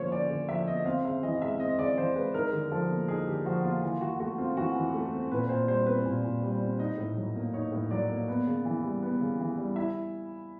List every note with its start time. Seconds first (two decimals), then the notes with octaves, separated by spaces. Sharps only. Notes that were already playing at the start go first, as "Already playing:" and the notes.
Already playing: D3 F3 A#3 C#4 C5 C#5
0.11 C#4 D5
0.30 D3
0.48 F3 E5
0.67 A#3 D#5
0.85 C4 F5
1.05 C#3 E5
1.23 E3 D#5
1.42 G#3 E5
1.60 C4 D#5
1.79 C#3 D5
1.97 E3 C5
2.16 G#3 B4
2.34 D#4 A#4
2.53 D3
2.72 F3 A4
2.90 A#3
3.08 D#4 G#4
3.27 D3 G4
3.45 F3 F#4
3.64 A#3 F4
3.83 E3 F4
4.01 E3 F#4
4.20 A3 F#4
4.38 C4 F4
4.57 E3 F#4
4.75 E3
4.94 A3
5.13 C4
5.31 A#2 B4
5.49 A#2 C5
5.68 G3 C5
5.86 C4 B4
6.06 A#2
6.24 A#2
6.42 G3
6.61 C4
6.79 D#4 D#5
6.98 A2
7.17 F#3
7.35 A#3
7.54 D#4 C#5
7.72 A2
7.91 F#3 D5
8.09 A#3
8.28 B3
8.46 C#3
8.65 E3
8.83 G3
9.03 B3
9.20 C#3
9.40 E3
9.58 G3
9.76 E4 E5